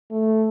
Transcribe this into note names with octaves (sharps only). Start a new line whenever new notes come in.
A3